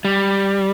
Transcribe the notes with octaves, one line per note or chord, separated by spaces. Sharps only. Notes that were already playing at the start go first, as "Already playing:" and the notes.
G3